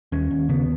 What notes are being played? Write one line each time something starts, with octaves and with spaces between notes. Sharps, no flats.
D#2 C#4
D#2
C#3 B3